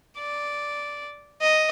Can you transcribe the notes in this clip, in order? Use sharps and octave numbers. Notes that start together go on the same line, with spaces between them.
D5
D#5